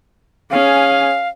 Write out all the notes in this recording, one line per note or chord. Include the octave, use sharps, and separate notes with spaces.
C#4 G#4 F5